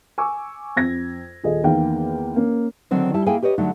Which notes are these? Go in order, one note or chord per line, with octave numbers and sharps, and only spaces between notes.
G#5 C#6 D6 E6
F2 G#6 A#6
D#1 G#4 A4 D#5
E2 D#3 A#3 F5 G5
A#3 C#4
D3 D#3 F#3 C4 D#4
G3 E4 A5
A#3 E4 G#4 E5 G5 G#5
G4 B4 C#5 D#5
D3 F#3 A3 D4 D#4